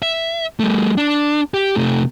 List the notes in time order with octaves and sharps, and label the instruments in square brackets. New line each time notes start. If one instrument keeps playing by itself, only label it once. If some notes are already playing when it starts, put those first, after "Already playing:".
[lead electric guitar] E5
G3 A3
D4
G4
C3 A3